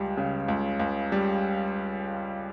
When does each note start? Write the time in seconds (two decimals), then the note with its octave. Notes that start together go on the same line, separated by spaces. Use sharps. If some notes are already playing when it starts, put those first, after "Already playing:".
Already playing: C#2 G3
0.17 C#3
0.48 C#2
0.80 C#2
1.12 G3